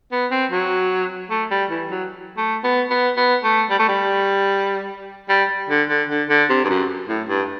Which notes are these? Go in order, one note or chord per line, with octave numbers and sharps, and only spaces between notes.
B3
C4
F#3
A3
G3
E3
F#3
A3
B3
B3
B3
A3
G3
A3
G3
G3
D3
D3
D3
D3
C3
G2
F#2
A2
G2